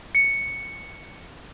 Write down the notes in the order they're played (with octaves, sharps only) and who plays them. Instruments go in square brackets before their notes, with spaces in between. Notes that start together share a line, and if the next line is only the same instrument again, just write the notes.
[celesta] C#7